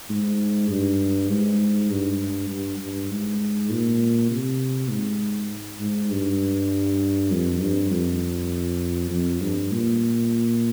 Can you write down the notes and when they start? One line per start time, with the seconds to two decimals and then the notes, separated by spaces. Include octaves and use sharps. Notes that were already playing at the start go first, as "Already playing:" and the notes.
0.09 G#2
0.70 G2
1.30 G#2
1.90 G2
2.50 G2
2.80 G2
3.10 G#2
3.70 A#2
4.31 C3
4.90 G#2
5.80 G#2
6.10 G2
7.31 F2
7.60 G2
7.91 F2
9.11 F2
9.41 G2
9.71 A#2